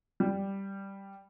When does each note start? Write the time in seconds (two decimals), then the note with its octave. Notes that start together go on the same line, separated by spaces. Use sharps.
0.20 G3